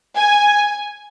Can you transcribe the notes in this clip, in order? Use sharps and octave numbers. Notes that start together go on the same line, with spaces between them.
G#5